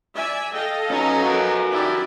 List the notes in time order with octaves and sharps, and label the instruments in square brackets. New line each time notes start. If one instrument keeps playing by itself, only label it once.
[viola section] D5 E5 G#5
[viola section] A4 D#5 F5 [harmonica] G5
[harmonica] F#3 B3 D#4 [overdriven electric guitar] C#4
[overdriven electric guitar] F#4 A#4
[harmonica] D#3 [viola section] E4 G4 D5